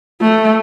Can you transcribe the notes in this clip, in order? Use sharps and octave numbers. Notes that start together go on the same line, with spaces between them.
A3